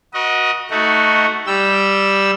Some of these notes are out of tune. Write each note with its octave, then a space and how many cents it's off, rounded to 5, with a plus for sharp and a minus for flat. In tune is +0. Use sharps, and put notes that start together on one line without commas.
F#4 -10 A#4 +45 D#5 +10
A3 +0 D#4 +10 F#4 +0
G3 +0 G5 +0 E6 +0